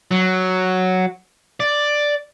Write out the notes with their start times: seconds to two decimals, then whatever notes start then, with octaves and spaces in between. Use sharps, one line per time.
0.11 F#3
1.60 D5